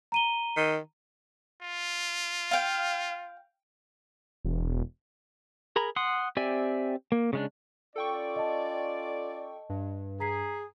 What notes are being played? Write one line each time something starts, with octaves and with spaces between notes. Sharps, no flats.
A#5 D#7 G7
D#3
F4
F5 G5
E1
G#4 A#4 A#5 B5
F#5 C6 D#6
C4 G4 D5 E5 G#5
A#3
C#3 G#3 D4
C#4 F4 A4 D5 G5 C#6
D#5 A5
G2
G#4 A#5 B6 C7